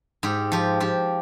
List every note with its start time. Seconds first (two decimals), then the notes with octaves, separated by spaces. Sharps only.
0.23 G#2 G4
0.52 F3 G4
0.80 F3 G4